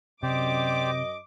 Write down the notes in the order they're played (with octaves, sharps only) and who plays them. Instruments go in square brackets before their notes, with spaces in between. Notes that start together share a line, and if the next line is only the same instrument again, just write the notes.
[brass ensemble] F#2 D#5 [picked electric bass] C3 [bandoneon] G4 C5 D5 [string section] D6